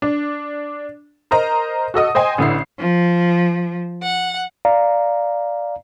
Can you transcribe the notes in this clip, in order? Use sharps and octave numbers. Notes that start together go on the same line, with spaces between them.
D4
A#4 C5 D#5 A#5
F#4 A4 D#5 D#6
C5 D#5 G5 G#5 C6
A1 D3 E4 C7
F3
F#5
D5 F5 A#5